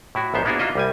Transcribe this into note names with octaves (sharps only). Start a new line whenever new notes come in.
A2 E4 F#4
A#1 G#2 B3 C5 E5
A#3 B3 D4 E4 F#4 G#4
A#3 F4 F#4 D#5 E5
C2 G3 G#5